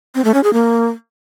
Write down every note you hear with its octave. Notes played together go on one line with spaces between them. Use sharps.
C4
A3
C#4
G#4
A#3